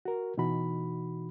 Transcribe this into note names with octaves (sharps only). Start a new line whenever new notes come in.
F#4 A#4
B2 E3 D#4 F#4 B5